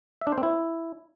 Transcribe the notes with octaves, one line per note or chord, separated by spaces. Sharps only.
E5
D4
C5
C4
E4